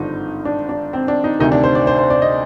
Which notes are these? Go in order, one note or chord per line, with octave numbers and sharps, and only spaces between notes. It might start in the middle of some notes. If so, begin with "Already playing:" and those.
Already playing: G#1 G2 D3 F3 D#4
D4
D4
C4
D4
D#4
D2 C3 D#3 D#4
D4
C5
D5
C5
C5
D5
D#5